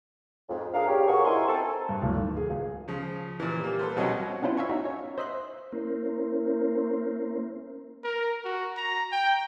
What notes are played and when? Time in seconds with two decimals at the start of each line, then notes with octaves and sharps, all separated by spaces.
0.49 F2 G#2
0.74 D4 G#4 A#4 F5
0.88 C#3 G4 C#5
1.07 G2 A#2 F#4 G#4 A#4 C#6
1.25 D#4 E4 A#4 C5 G#5 C6
1.48 C4 A4
1.89 G2
2.02 D1
2.17 D#3
2.37 G#4
2.50 C#2
2.88 C#3 F3
3.40 A#2 E3
3.60 G3 A#3
3.79 A4 B4 C5
3.96 C2 B2 F#3 C4 C#4 D#5
4.42 B3 C#4 D4 E4 F4 C5
4.57 E5 F5 G#5 C#6
4.69 D#4 F#4
4.85 C#5
5.18 C5 D#5 E5 C6 F#6
5.72 A#3 C#4 E4 A#4 C5
8.04 A#4
8.45 F#4
8.77 A#5
9.12 G5